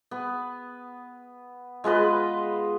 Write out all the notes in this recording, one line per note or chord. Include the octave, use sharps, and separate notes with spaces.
B3
G#3 F4 B4 D#5